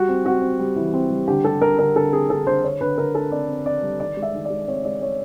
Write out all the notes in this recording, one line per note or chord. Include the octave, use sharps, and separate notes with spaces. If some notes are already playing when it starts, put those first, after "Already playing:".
Already playing: G3 F#4
C4
C4 F#4
C4
G3
E3
C4
G3
D3 G4
G3 A4
D3 A#4
D3 A#4
D3 A4
C4 G#4
D3 A4
D3 C5
D3 C#5
D3 B4
D3 A#4
D3 A4
C4 D5
C4
C4 D5
G3
D#3 D5
G#3
E5
D#3
D5
G#3
C4 C#5
G#3 D5
G#3 C#5